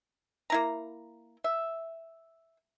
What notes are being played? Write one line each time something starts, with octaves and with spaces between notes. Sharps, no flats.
A#3 E4 A#5
E5